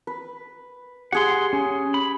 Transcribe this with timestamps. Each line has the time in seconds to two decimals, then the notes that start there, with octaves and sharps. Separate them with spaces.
0.07 B4
1.12 G4 G#4 F#5 C6
1.53 C#4
1.94 B5